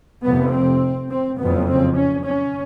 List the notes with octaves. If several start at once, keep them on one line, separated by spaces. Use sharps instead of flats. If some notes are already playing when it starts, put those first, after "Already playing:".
F1 F2 C3 B3
C4
C4
F#1 F2 C#3 B3
C4
C#4
C#4